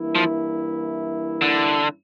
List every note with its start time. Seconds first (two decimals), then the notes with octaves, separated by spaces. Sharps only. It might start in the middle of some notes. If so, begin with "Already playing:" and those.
Already playing: G2 E3 A#3 E4
0.15 F3
1.42 D3